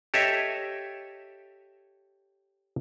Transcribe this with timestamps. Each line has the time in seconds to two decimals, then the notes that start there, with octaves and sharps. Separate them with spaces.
0.14 G4 A4 C#5 D#5 E5